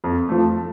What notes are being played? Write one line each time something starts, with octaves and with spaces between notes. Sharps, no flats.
F2
F3 A3